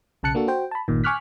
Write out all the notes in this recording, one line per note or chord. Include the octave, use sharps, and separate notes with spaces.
B1 C#3 A5 F#6 C#7
A#3 D4 F#4 A4
F#4 C5 G5
A5 B5
G1 A#2 D#3
G#5 C#6 D6 F6 F#6 B6